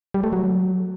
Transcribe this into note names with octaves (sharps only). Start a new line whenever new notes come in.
G3
A3
F#3